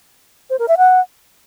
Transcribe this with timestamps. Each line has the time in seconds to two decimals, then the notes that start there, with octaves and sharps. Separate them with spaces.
0.50 C5
0.59 A#4
0.68 E5
0.78 F#5